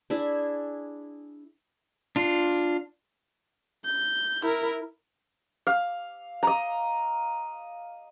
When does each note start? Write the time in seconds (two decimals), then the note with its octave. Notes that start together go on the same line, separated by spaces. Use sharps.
0.10 D4 E4 G#4 E5
2.16 D4 F4
3.85 G6
4.43 E4 A#4
5.67 F5
6.43 D#5 A#5